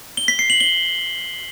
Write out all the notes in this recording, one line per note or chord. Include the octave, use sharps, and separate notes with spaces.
G7
B6
C7
F#7
G7